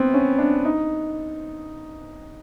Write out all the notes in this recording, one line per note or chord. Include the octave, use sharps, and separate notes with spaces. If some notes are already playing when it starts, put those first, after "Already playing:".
Already playing: B3 C4
C#4
D4
D#4